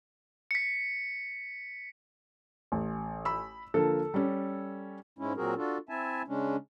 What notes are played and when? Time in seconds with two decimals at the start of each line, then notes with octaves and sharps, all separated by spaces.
0.51 B6 C#7
2.72 A1
3.25 B5 E6
3.74 D3 F3 A#3 A4
4.14 G3 C#4
5.19 G#2 G#3 C#4 E4
5.37 A#2 F#3 C4 F#4 G#4 A#4
5.57 D4 F4 F#4 A4
5.89 C4 E4 E5 G#5 A5
6.28 C#3 G#3 C#4 D4